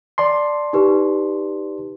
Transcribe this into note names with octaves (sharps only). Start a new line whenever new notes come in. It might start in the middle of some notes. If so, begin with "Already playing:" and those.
D5 A5 C6
D#4 G4 B4